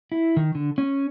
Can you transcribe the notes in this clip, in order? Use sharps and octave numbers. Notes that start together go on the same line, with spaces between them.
E4
D#3
D3
C#4